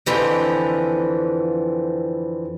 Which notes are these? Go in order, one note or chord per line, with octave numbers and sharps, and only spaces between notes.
F2 D3 E3 F3